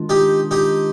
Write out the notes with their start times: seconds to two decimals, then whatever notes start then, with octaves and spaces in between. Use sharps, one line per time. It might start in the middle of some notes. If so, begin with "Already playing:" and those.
Already playing: D#3 G#3 D4 F4
0.09 D#4 G4
0.51 D#4 G4